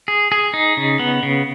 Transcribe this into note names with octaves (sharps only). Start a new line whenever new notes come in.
G#4
G#4
D#4
C#3
B3
C#3